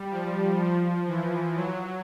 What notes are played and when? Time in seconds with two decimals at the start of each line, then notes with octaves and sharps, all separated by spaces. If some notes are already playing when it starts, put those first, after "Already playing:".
Already playing: G3
0.11 F3
0.59 F3
1.07 E3
1.55 F#3